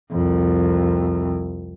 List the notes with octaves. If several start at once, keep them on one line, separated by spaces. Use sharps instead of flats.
C2 F2